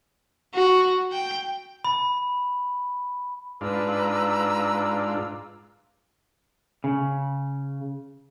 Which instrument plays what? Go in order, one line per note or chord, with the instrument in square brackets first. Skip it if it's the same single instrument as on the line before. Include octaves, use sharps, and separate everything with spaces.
[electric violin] F#4
G5
[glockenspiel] B5
[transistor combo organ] G#2 D4 F4 [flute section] B4 A#5 E6
[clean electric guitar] C#3